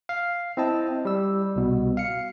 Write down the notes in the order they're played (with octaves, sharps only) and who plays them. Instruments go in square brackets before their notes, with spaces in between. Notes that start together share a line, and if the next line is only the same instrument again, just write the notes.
[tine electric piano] F5
C4 E4 D#5 A5
G3 E6
C2 B2
F5 C#7